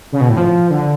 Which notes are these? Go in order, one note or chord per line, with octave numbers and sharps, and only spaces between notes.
C#3
B2
A2
F3
D3